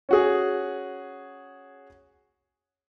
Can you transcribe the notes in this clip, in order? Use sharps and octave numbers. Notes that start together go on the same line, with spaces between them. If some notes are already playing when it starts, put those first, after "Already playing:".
C#4 F#4 G#4